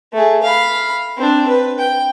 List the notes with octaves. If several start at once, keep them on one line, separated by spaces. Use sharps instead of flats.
A3 G#4
F5 B5
C4 D4
B4
G5